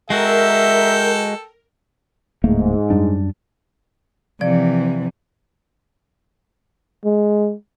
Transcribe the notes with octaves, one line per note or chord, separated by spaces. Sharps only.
G#3 F#4 A4 A#4 E5 G5
D1 G#2 A3 A#3
F#2 G3 D4
C3 E3 F3 D5
G#3